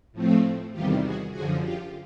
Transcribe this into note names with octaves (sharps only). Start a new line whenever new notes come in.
A2 F3 A3 C4
E2 C3 D#3 G3 F4 G4
F#4 G#4
F#2 D3 F3 F#4 G#4
F4 G4